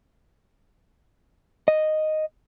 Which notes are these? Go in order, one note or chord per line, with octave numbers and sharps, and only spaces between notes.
D#5